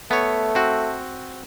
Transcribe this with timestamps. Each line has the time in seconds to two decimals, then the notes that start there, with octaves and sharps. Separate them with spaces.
0.11 A3 B3 C#5
0.55 C4 F#4